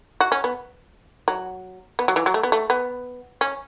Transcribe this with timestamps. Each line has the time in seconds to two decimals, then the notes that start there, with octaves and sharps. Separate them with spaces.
0.21 F#4
0.32 C#4
0.44 B3
1.28 F#3
1.99 B3
2.08 F#3
2.16 E3
2.26 F#3
2.34 A3
2.43 B3
2.52 A3
2.70 B3
3.41 C#4